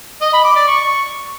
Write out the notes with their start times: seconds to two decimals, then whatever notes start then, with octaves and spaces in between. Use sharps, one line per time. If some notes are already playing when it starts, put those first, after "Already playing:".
0.22 D#5
0.33 B5
0.45 D6
0.56 D5
0.68 C#6